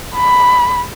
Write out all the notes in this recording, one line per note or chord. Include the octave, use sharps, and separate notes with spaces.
B5